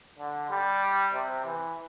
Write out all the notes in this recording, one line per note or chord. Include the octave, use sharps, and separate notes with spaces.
D3
G3
C3
E3